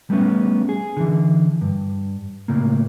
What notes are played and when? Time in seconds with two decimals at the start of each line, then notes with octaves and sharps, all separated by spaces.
0.10 G3 A3 B3 C#4
0.69 G#4
0.97 D3 E3
1.61 G2
2.48 A2 C#3 A#3